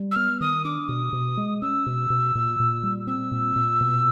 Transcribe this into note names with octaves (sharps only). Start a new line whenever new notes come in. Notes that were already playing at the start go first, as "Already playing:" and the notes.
Already playing: G3
E6
B3 F6
D#3 D#6
D4 D6
B2 D#6
B2
G#3
C#4 E6
B2
B2
A#2
A#2
G3
C4 E6
A#2
A#2
B2